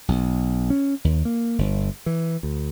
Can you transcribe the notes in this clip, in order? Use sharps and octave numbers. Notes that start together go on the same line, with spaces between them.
B1
C#4
D#2
A#3
G1
E3
D2